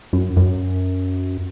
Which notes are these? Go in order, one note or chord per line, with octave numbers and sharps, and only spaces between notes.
F#2
F#2